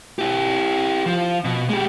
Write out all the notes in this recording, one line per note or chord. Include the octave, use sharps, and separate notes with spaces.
E4 G4
F3
B2
G#3 G4